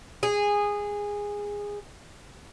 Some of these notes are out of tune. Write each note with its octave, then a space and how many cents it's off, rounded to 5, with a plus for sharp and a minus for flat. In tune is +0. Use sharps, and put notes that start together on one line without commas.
G#4 -15